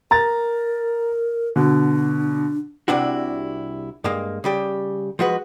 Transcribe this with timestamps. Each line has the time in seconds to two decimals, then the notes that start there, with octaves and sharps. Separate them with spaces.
0.11 A#4 A#5 A6
1.56 B2 D3 D4
2.88 C2 C3 D4 E4 F#4
4.04 G2 G#3 A#3
4.44 C#3 G3 G4
5.19 F3 G#3 F#4 B4